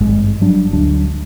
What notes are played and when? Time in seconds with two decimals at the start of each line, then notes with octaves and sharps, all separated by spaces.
0.01 G#1 G2 G#3
0.41 F#3 G3 D4
0.73 D2 F#3 D4